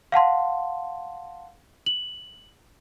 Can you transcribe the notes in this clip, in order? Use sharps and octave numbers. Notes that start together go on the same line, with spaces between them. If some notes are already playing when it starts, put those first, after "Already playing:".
F5 F#5 A5 C6
F#7